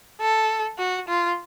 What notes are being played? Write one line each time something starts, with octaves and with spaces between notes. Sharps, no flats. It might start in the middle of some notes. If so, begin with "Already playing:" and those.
A4
F#4
F4